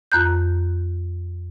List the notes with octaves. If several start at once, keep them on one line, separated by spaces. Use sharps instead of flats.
F2 A#5 F#6 G6